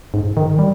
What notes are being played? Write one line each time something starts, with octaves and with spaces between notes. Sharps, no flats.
G#2
D#3
G3